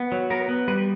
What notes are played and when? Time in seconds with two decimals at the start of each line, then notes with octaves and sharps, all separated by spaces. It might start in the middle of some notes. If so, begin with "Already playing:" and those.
Already playing: B3
0.12 F#3
0.30 B3 A#4
0.49 B3
0.68 G3 B4